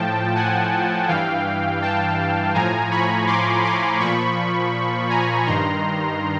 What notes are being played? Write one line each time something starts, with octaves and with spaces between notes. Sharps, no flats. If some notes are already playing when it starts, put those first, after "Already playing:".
Already playing: A2 F3 G5 A5
F#5 G#5
G2 E3 F5 G5
G5 A5
A2 F3 G#5 A#5
B5 C#6
C6 D6
C6 D6
A#2 F3 B5 C#6
G#5 A#5
G2 D#3 A#5 C6